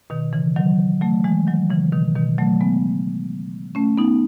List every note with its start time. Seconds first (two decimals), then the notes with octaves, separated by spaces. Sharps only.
0.10 B2 D#3
0.33 C#3 E3
0.56 D#3 F#3
1.01 F#3 A3
1.24 E3 G#3
1.47 D#3 F#3
1.70 C#3 E3
1.92 B2 D#3
2.15 B2 D#3
2.39 F#3 A3
2.61 G#3 B3
3.75 A3 C#4
3.98 B3 D#4